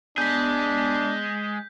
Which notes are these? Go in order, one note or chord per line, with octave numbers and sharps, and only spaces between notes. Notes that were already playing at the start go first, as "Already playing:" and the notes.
G#3 B3 D4 G#4 G6 B6